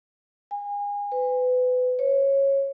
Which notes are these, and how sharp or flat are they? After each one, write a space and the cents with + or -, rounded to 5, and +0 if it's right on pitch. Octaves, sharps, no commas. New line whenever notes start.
G#5 -30
B4 +30
C#5 -15